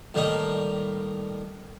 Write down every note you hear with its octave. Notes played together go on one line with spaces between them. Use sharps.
A2 D#3 G3 A#3 D#4